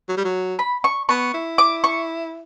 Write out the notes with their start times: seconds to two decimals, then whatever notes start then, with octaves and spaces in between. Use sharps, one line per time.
0.09 F#3
0.17 G3
0.25 F#3
0.59 B5
0.84 C#6
1.09 B3 C#6
1.34 E4
1.58 D6
1.84 C#6